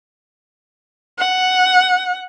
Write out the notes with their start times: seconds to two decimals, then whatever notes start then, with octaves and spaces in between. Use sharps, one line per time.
1.19 F#5